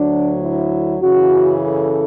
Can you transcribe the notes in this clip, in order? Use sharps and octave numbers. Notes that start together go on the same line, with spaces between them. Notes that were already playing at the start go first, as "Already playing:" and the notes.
Already playing: D2 D3 F#3 D4
E4
F#2 C#3 E3 F#4
A4